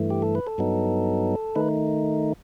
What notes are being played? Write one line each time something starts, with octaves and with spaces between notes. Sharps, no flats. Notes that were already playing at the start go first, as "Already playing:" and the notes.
Already playing: G2 E3 A3
G4
A4
B4
A4
G2 F#3 B3 D#4
D#3 A3 D#4 B4